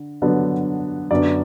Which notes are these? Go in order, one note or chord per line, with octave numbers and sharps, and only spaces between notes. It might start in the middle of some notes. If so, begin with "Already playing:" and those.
Already playing: D3
D3 F#3 B3 D4
F#2 D3 F#3 B3 D4 D5